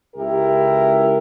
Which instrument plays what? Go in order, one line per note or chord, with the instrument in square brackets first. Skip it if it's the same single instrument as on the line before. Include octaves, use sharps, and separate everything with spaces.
[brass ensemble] C#2 E4 G4 A#4